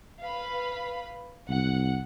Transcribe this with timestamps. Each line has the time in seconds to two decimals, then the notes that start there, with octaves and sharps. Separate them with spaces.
0.24 B4 F5 B5
1.49 C2 F#5